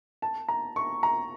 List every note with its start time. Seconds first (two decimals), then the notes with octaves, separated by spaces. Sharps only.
0.22 A5
0.48 A#5
0.76 C#6
1.03 A#5